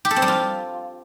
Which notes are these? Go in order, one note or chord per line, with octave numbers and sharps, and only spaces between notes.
G4
A4
C4
G3
F4